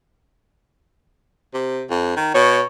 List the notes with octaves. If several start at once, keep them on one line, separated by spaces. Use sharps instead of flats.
C3
F2
D#3
B2 C#5